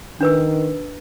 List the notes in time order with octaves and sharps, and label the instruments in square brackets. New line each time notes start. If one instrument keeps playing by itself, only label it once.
[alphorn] D#3 [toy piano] D4 B4 E6